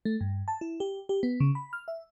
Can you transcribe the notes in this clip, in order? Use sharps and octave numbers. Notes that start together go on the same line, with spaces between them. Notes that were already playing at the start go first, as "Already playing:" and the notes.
A3
G2
A5
E4
G4
G4
B3
C#3
B5
F6
E5